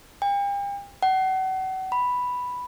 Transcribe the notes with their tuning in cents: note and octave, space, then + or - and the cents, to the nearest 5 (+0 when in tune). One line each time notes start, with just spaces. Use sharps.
G5 +40
F#5 +35
B5 +0